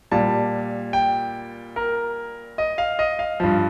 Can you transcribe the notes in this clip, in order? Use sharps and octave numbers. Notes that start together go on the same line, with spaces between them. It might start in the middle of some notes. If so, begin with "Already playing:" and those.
A#2 G3 A5
G5
A#4
D#5
F5
D#5
F5
G2 F3